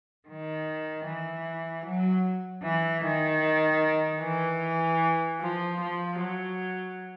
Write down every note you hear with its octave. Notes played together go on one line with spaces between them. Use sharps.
D#3
E3
F#3
E3
D#3
E3
F3
F3
F#3